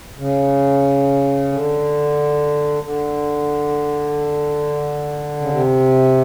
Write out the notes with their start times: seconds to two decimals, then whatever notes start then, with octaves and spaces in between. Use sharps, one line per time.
0.18 C#3
1.52 D3
2.84 D3
5.41 C#3
5.50 C3